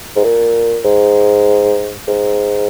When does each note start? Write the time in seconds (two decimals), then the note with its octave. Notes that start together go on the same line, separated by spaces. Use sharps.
0.16 G#2
0.24 A#2
0.85 G#2
2.08 G#2